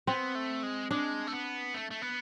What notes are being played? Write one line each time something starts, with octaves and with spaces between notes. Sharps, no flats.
B3 C4
A3
G#3
G#3 D4
A3
B3
A3
A3
B3